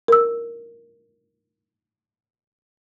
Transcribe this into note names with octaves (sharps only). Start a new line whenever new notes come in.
A#4 E6